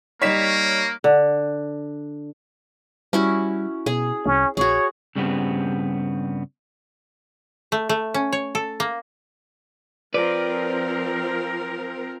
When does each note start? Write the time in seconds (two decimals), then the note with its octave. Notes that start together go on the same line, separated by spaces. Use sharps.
0.22 G3 A#3 D#4 C#5 B6 E7
1.04 D3
3.13 G3 C#4 E4 F#4
3.86 B2 G#4
4.26 C2 C#4
4.57 A#1 F#4 G#4 C#5
5.16 G2 C#3 G3 B3 C4
7.72 A3
7.89 A3
8.14 C#4
8.32 C#5
8.55 A4
8.80 A#3
10.14 F3 C4 A#4 B4 D5